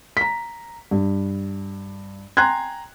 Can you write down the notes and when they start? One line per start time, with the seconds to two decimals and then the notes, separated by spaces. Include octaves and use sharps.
0.17 A#5 B6
0.91 G2
2.37 G5 G#5 A#5 C6 F#6 G#6